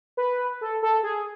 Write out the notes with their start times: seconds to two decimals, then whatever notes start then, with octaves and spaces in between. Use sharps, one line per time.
0.17 B4
0.61 A4
0.83 A4
1.03 G#4